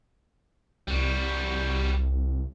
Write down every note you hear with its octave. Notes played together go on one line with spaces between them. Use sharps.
C2 G3 F#4